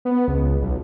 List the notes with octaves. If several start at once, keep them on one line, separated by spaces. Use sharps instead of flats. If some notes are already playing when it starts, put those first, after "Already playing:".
B3
C#2
B1